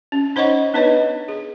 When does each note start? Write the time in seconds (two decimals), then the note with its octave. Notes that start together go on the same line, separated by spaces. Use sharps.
0.12 C#4
0.36 D#4 C5 C#5 D#5 F#5 C#6
0.74 B3 D4 D#4 B4 C#5 D#5
1.28 G#4